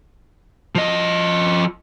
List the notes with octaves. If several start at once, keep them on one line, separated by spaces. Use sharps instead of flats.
F3 D#5